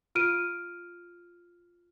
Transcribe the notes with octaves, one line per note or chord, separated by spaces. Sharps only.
F4 F6 D7 D#7